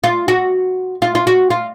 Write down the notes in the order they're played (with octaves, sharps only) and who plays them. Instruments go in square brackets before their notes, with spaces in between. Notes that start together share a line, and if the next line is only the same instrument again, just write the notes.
[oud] F4
F#4
F4
F4
F#4
F4